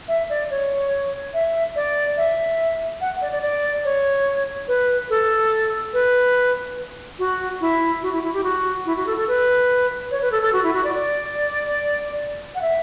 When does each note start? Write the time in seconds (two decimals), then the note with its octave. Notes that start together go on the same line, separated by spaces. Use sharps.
0.08 E5
0.30 D5
0.50 C#5
1.34 E5
1.76 D5
2.17 E5
3.01 F#5
3.22 D5
3.32 D5
3.42 D5
3.84 C#5
4.68 B4
5.10 A4
5.93 B4
7.19 F#4
7.61 E4
8.02 F#4
8.12 E4
8.23 E4
8.34 G4
8.43 F#4
8.86 E4
8.97 F#4
9.07 A4
9.17 A4
9.28 B4
10.11 C#5
10.22 B4
10.32 A4
10.43 A4
10.53 F#4
10.64 E4
10.74 F#4
10.84 D5
10.95 D5
12.55 F#5
12.62 E5